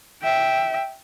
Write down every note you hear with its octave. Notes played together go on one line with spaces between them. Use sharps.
E5 G5